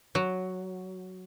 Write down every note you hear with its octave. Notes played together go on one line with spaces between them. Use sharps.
F#3